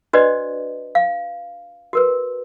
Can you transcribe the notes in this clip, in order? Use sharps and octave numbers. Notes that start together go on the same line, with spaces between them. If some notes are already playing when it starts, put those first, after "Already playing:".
D4 F#4 B4 C5 D5 D#5
F5
F#4 A#4 B4